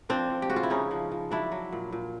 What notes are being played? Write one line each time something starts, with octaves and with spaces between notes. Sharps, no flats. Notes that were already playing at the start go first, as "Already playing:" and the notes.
F3 C4 D4
F3
G4
C#3 F#4
F4
E4
C#3 C#4 D#4
F3
F3
F#3 D4 E4
F#3
A#2
A#2